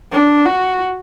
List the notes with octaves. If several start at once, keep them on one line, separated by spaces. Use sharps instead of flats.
D4
F#4